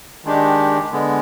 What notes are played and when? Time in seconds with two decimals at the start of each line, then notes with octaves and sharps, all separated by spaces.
0.25 D#3 G#3 D4 G4
0.91 D3 G#3 B3